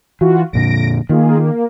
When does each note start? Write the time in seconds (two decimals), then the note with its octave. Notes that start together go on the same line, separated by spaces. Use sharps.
0.21 E3 F4 F#4
0.53 F2 A#2 D3 A#6 D7
1.09 D#3 A#3 F4 G#4
1.39 A#3